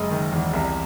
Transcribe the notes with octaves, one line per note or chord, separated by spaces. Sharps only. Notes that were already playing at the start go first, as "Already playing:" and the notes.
Already playing: F#1 G#3 D#5
D#3
E2
C2